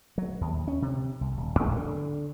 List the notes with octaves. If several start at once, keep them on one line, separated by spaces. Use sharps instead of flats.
F#3
D#2
C#4
C3
C2
D#1
B1
D3